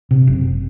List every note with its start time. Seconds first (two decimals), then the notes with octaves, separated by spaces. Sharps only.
0.11 C3
0.27 F#1